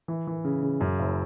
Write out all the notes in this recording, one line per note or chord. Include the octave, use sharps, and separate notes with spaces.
E3
E3
C#3
C#3
F#2
F#1